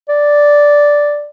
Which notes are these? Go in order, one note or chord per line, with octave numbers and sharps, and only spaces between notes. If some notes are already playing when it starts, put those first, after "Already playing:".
D5